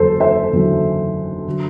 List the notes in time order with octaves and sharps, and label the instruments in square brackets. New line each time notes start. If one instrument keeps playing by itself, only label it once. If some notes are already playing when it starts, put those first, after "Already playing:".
Already playing: [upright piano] F#1 E2 D3 F#3 A4 C5
C5 E5
F#1 E2 D3 F#3
D3 F#3